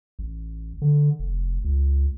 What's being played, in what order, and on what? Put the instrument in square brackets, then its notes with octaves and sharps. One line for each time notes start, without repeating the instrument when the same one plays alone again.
[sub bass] A1
D3
F1
C#2